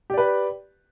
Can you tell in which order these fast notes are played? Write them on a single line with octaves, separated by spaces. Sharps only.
G4 D5 B4